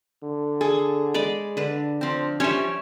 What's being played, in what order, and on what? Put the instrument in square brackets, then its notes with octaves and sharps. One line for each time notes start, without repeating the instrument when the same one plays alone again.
[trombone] D3
[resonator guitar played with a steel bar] G#4 [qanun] A4
[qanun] G#3 D5 B5
[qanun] D3 B4 [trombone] D4
[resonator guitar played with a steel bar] F3 C4
[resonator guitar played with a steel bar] F3 G3 C#4 [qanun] C#5 E5